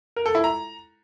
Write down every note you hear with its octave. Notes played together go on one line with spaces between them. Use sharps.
A#4
A4
E4
A#5